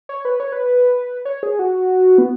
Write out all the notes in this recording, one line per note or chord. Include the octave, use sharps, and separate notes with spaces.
C#5
B4
C#5
B4
C#5
G#4
F#4
B3